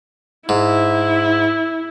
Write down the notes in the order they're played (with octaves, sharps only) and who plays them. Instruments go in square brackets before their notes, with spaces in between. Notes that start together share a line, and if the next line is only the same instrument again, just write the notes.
[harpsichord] G#2 [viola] E4